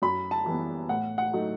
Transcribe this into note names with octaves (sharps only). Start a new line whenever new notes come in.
F#2 B5
A5
E3 G3 B3
A2 F#5
F#5
F#3 A3 D#4